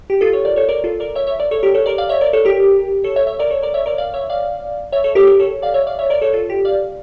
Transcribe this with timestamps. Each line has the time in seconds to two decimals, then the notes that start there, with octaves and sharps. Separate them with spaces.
0.10 G4
0.21 F4 A4
0.33 A4 C#5
0.45 A#4 D5
0.56 A4 C#5
0.69 A#4 D5
0.84 F4 A4
1.00 A#4 D5
1.15 C#5 E5
1.27 C#5 E5
1.39 A#4 D5
1.51 A4 C#5
1.63 G4 A#4
1.74 A4 C#5
1.86 A#4 D5
1.98 D5 F5
2.09 C#5 E5
2.21 A#4 D5
2.33 A4 C#5
2.45 G4 A#4
3.04 A4 C#5
3.16 C#5 E5
3.27 C#5 E5
3.39 A#4 D5
3.50 A4 C#5
3.62 A#4 D5
3.74 C#5 E5
3.86 A#4 D5
3.98 D5 F5
4.14 C#5 E5
4.30 D5 F5
4.92 C#5 E5
5.04 A4 C#5
5.15 G4 A#4
5.27 G4 A#4
5.39 A4 C#5
5.62 D5 F5
5.74 C#5 E5
5.87 D5 F5
5.99 C#5 E5
6.10 A#4 D5
6.21 A4 C#5
6.33 F4 A4
6.50 G4
6.65 D5 F5